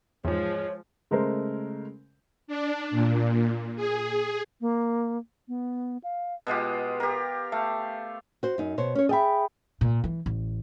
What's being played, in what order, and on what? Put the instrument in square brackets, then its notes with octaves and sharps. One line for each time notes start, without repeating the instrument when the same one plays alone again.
[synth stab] E2 G#2 [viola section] F3 G#3 [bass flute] C#5
[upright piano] C#3 G#3 A3 A#4 C5
[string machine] D4
A#2
G#4
[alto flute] A#3
B3
F5
[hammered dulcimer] B2 G#3 F4 G4
G4 A#4
A3 F5
[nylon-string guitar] F#4 C5
F#2 D#4
B2 C5 C#5
C#4 C#5
[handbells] G#4 G5 B5 [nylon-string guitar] D#5 E5
[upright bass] A#2
E3
A1